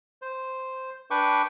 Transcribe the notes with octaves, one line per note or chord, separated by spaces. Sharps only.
C5
D4 B4 G5 C#6 D6